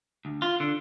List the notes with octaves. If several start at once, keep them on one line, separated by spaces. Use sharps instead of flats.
D2
F4
D3